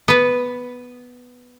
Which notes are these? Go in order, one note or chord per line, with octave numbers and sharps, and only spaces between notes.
B3 B4